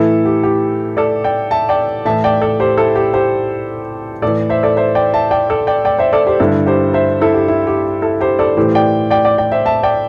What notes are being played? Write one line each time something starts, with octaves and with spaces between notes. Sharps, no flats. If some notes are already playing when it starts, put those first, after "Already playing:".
Already playing: A2 E3 E4 A4
G4
G4
A4 D5
D5 G5
E5 A5
D5 G5
A2 E3 E5 A5
D5 G5
A4 D5
G4 C5
E4 A4
G4
G4 C5
A2 E3 A4 D5
C5 E5
A4 D5
C5 E5
D5 G5
E5 A5
D5 G5
A4 D5
D5 G5
D5 G5
C5 E5
A4 D5
G4 C5
G2 D3 E4 A4
G4 C5
C5 E5
E4 A4
G4
E4
G4
E4 A4
G4 C5
A4 D5
A2 E3 G4 C5
D5 G5
D5 G5
D5 G5
D5 G5
C5 E5
E5 A5
D5 G5